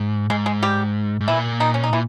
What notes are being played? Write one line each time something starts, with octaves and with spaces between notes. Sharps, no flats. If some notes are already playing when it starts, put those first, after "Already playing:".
Already playing: G#2
G#2 G#3
G#3
G3 G4
G#2
A#2 E3 E4
D#3 D#4
C#4
D#4
A#2 E3